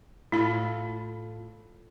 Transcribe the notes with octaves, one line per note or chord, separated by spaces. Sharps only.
A2 E4 F4 A4 B5